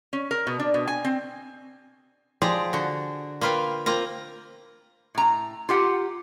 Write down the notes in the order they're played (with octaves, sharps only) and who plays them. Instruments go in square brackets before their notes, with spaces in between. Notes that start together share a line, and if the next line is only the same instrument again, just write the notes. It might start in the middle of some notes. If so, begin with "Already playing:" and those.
[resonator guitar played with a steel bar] C#4
A#4
B2
D4
B2
G#5
C4
[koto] F3 G#3 G4 G#4 D5 A#5
D3 F#4
A#3 F4 B4 F5 G5
A#3 C4 F4 A#5
[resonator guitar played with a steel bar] A2 A#5
F4 G4 F#5